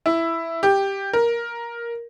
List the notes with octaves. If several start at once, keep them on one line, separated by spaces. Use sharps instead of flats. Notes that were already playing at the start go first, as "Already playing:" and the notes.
E4
G4
A#4